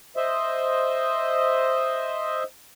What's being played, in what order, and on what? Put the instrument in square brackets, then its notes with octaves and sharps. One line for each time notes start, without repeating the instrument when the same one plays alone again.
[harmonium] C5 D#5 E5